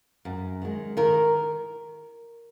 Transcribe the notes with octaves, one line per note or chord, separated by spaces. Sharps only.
F#2
D#3 G#3
D#3 A#4